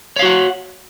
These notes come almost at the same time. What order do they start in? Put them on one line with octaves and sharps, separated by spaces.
C#5 F5 F#4 F#5